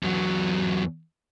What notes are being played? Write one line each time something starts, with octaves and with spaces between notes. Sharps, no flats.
E2 F#3